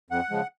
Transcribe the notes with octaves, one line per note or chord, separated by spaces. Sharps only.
F2 F#5
C#3 F3 G#3